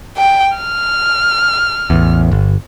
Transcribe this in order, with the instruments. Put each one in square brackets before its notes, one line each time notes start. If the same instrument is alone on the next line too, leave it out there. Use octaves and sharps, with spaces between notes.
[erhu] G5
F6
[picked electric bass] A1 E2
G1